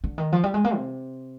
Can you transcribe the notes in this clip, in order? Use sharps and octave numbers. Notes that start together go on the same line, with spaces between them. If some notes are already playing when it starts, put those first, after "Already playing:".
D3
D#3
F3
G3
G#3
A#3
C3